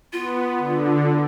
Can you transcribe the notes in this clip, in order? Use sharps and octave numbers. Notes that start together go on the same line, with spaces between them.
B3 F4
D3